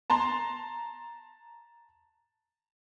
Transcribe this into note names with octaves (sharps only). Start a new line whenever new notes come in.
A5 A#5 C6